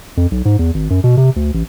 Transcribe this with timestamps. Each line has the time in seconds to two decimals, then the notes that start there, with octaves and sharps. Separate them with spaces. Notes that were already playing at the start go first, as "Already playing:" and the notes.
0.17 F2
0.31 B1
0.45 G#2
0.59 E2
0.74 G#1
0.90 F#2
1.04 B2
1.17 C3
1.36 D2
1.54 A1